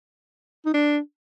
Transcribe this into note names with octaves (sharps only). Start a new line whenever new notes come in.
D#4
D4